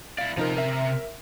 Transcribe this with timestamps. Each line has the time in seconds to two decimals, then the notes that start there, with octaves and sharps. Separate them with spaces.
0.19 E4 D5 F5
0.37 C3 F3 D#4 A#4 A#5
0.57 A#4 E5